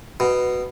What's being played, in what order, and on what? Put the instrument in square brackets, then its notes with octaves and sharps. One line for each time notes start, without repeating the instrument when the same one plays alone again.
[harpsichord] B2